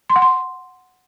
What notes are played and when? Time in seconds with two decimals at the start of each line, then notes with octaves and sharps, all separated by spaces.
0.10 C6
0.16 F#5
0.22 C6